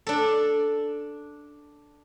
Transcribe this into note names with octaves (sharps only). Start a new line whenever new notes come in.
D4 A4